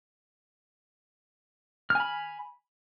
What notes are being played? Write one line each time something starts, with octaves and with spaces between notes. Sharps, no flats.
G#5 B5 F6